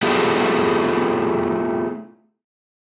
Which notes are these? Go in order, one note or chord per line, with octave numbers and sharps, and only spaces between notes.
A3 B3 E4 F4 G4 G#4